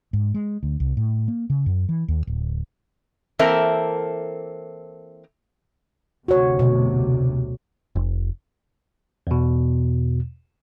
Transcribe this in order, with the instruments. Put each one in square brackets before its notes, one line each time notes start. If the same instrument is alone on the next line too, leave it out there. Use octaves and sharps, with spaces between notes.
[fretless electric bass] G#2
G#3
D2
C2
A2
A#3
C#3
F#2
E3
D#2
D1
[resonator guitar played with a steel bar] E3 A#3 C4 A4 A#4 E5
[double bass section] F1 D2 C3 [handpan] F#4 C#5
[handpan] B2
[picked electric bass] F1
[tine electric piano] E2 B2